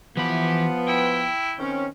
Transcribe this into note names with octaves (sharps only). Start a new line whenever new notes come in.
E3 F3 B3 G4 B5
E4 G5
D#3 C4 C#4